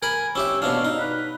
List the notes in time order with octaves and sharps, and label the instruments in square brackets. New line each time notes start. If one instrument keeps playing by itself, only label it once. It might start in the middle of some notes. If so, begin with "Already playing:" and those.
[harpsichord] A#4 B5 [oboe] G#5
[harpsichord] C#4 G4 E5 [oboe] E6
[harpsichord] B2 C#4 D4 [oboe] F5
[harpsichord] D#4
[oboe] B4